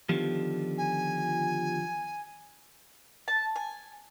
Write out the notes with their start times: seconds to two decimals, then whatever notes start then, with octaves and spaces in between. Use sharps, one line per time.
0.09 D3 D#3 F3 B3 F4 G4
0.78 G#5
3.28 A5
3.56 G#5